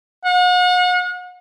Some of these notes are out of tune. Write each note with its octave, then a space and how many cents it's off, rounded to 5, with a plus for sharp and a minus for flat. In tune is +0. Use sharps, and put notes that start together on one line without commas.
F#5 -40